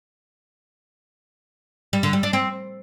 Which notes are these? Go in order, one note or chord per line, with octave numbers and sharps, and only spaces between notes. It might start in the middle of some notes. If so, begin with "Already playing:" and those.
G3
D3
G3
D4
C4